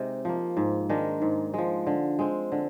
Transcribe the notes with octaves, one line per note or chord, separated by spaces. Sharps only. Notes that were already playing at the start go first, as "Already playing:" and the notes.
Already playing: C3 G#3 D#4 G4
F3 A#3
G#2
D#3 G#3 D4
G#2
F3 G#3
D3
G#3 C4
D3